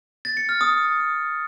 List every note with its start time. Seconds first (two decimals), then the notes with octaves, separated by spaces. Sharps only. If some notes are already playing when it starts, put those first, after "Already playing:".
0.25 A6
0.37 C#7
0.49 F6
0.61 D#6